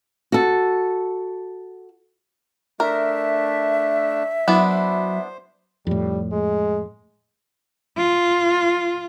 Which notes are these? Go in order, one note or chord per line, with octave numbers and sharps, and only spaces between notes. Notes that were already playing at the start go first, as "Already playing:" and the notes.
F#4 A4
A3 D4 A#4 E5
F#3 B3 D4 E4 C5
F2 A2 G3
G#3
F4